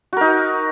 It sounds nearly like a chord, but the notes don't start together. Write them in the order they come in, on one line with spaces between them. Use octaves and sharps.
F#4 A#4 D#4